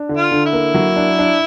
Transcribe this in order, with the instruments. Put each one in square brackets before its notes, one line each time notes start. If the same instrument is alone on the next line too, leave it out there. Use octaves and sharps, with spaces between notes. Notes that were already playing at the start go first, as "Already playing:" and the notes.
Already playing: [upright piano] D4
D3
[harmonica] F4
[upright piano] D3
[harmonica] E4
[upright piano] A#3
F#3
D4
D4